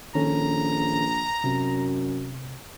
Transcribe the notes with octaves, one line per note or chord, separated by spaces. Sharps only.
A#1 D#3 C#4 A4 A#5
F#2 C3